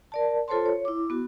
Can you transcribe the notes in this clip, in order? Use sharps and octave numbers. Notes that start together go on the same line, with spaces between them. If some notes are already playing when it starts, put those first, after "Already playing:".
A#4 D5 A5
F4 A4 C5 C#5 A5 C6
C#5
E4 D6
B3 F#4